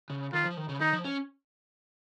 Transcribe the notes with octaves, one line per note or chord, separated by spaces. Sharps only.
C#3
D#3 F4
F3
D#3
C#3
D#3 D#4
F3
C#4